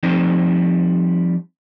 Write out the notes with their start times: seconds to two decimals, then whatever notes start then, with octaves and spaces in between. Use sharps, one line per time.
0.03 F3 G3 C4 D#4 D#5